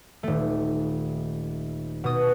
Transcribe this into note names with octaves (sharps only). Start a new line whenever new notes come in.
D#1 A3
B2 D#6